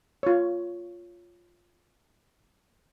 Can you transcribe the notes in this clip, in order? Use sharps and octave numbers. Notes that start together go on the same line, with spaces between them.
F4 C#5